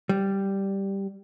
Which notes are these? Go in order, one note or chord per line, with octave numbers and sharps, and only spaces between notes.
G3